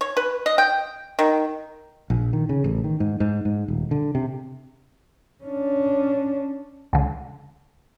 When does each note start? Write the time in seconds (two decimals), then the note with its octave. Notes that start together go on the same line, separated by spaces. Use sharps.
0.01 C#5
0.17 B4
0.46 D#5
0.58 G5
1.19 D#3
2.10 A#1
2.33 D#3
2.49 C#3
2.64 A1
2.84 D#3
3.00 G#2
3.20 G#2
3.45 G#2
3.68 D#1
3.91 D3
4.15 C3
5.44 C#4 D4
6.93 C#2 D3